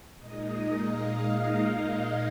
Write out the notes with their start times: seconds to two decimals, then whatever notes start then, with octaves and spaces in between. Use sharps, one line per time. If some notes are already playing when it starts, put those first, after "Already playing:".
0.18 A#2 G#3 D#4 D#5
0.84 F5
1.51 F5